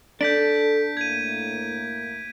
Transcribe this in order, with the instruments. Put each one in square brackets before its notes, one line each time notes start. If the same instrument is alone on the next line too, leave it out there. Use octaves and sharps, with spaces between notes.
[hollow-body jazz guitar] D4 [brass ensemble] A4 [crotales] G6 B6 D7
[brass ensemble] A2 A#3 [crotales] G#6 D#7